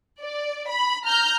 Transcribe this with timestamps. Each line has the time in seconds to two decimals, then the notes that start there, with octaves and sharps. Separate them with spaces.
0.21 D5
0.68 B5
1.06 A#5 F6 G6